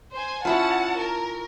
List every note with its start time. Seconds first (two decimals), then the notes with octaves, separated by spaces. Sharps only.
0.14 C5 G#5
0.45 C#4 E4 F4 F#5 A5
0.98 A#4